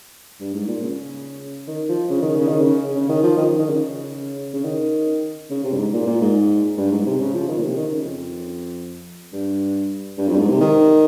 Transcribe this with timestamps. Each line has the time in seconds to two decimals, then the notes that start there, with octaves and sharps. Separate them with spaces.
0.40 G2
0.54 G#2
0.68 A#2
0.82 C#3
1.67 D#3
1.89 F3
2.10 C#3
2.22 D#3
2.36 C#3
2.48 D#3
2.61 C#3
2.96 C#3
3.09 D#3
3.23 F3
3.37 D#3
3.59 D#3
3.70 C#3
4.53 C#3
4.65 D#3
5.50 C#3
5.64 C3
5.73 G2
5.78 G#2
5.93 A#2
6.07 A#2
6.22 G#2
6.78 G2
6.92 G#2
7.06 C3
7.20 C#3
7.34 F3
7.49 D#3
7.57 A#2
7.63 C3
7.76 D#3
7.91 C#3
8.05 F2
9.33 G2
10.18 G2
10.28 F2
10.34 G2
10.39 G#2
10.49 C3
10.61 D#3